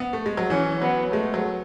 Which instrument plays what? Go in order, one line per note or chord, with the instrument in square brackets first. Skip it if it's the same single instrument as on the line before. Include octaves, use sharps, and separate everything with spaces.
[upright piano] B3
A3
G#3
F#3
[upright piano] E3 [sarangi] C#4
[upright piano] F#3 [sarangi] B3
[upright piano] G#3 [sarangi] A3
[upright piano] F#3